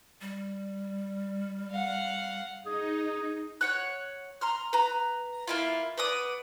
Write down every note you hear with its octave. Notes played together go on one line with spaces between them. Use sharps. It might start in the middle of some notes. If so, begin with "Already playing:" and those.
G3
F5 F#5
D#4 G#4
C#5 F#5 F#6
A#5 C6 F6
B4 A#5
A#3 E4 F4
B3 D5 D#6